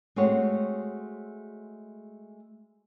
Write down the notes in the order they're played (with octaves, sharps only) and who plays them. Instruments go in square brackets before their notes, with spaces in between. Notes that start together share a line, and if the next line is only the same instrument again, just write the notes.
[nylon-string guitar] G#3 A3 C4 F#4 G#4 C#5